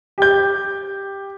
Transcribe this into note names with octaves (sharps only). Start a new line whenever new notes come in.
G4 G6